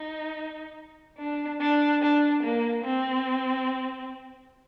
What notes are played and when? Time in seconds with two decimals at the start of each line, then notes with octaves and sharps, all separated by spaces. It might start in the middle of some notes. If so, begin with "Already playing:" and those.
Already playing: D#4
1.18 D4
1.60 D4
2.02 D4
2.44 A#3
2.85 C4